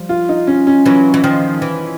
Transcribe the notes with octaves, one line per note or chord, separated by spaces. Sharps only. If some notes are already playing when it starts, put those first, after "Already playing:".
Already playing: F3 G3
F4
D#4
C#4
C#4
E3 F#3 C#4
E3
D#3 F3
E3